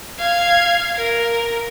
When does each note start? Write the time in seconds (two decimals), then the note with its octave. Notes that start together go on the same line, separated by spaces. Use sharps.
0.19 F5 G#6
0.96 A#4